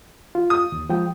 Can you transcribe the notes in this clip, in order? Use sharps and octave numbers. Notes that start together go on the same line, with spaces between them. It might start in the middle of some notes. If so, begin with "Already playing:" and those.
F4
D#6
D#2
F3 G#3 G5